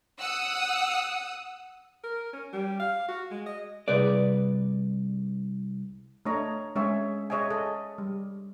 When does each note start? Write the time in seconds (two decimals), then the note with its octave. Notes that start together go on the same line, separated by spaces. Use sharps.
0.19 F#5 D#6 E6
2.04 A#4
2.33 C#4
2.53 G3
2.80 F5
3.08 F#4
3.31 G#3
3.46 D#5
3.88 C2 G#4 B4 D5
6.25 A3 D4 A4 C#5 D#5 A#5
6.76 G#3 C#4 G#4 C#5 E5
7.30 G#4 C#5 D#5 E5 G#5
7.50 G#4 A4 D#5
7.98 G3